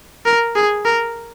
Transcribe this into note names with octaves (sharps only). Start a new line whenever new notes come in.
A#4
G#4
A#4